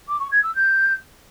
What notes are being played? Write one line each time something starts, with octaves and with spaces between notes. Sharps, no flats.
D6
C#6
G#6
E6
G6